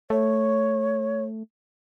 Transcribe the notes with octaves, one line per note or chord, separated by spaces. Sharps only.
A3 C#5